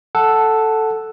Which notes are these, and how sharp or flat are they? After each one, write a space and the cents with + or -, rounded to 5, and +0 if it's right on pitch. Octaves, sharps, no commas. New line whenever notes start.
A4 +0 F#5 +0